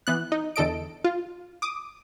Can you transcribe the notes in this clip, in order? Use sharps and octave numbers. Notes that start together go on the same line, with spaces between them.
E3 B3 F#6
D#4
E2 D3 A4 D#5 D7
F4
D6 D#6